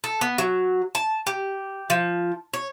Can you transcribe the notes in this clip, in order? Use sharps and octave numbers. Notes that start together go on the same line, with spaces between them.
A4
B3
F#3
A5
G4
F3
C#5